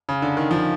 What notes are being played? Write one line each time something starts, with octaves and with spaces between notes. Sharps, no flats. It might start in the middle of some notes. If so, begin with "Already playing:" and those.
C#3
D3
D#3
F3